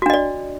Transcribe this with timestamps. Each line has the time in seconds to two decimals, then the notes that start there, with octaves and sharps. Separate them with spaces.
0.02 F#4
0.06 D4
0.10 D#5
0.14 D5